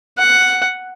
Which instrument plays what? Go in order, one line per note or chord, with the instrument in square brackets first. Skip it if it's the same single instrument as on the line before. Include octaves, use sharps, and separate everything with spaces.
[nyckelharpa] F#5